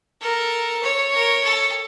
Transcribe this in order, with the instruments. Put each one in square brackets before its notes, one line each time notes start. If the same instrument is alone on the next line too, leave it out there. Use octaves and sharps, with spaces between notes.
[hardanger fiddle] A4 [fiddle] A#4
[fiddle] C#5
[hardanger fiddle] A#4
A4